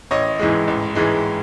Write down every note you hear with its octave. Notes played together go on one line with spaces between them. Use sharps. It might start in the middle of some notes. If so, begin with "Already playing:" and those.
A1 C#5 D#5
G#2 E3 G#3
A1
G#2 E3 G#3